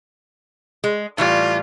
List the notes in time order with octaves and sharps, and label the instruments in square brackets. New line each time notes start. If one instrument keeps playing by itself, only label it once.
[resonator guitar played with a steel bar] G#3
[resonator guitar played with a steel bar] A2 E3 G3 [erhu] F4